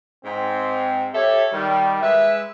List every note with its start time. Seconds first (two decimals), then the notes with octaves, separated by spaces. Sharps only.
0.24 G#2 C4
1.14 G4 A4 C#5 E5
1.52 D#3 G3
2.01 G#3 B4 E5